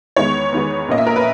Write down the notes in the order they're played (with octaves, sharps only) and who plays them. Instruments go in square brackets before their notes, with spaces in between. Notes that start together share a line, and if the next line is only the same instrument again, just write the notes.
[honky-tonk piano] E2 D#3 G#3 B3 C#5
E2 D#3 G#3 B3
A#1 A#2 A#3 C#4 D#5
E5
A#4
B4